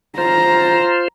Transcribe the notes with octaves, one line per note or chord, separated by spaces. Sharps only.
F4 C5 A#5